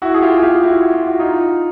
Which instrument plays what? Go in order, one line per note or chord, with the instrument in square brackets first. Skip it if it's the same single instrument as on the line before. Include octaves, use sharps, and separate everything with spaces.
[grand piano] E4 F#4
G#4
F4 G4
G#4
F4 G4
E4 F#4
F4
F#4
D#4 F4